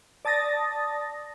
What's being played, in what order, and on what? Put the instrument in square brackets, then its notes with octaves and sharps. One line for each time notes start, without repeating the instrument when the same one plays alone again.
[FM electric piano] D5 A5 D#6 A6 A#6